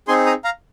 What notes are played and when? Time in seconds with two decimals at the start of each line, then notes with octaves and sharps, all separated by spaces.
0.08 C4 D#4 G#4 G#5 C6
0.26 A#5 D#6
0.44 F5 A#5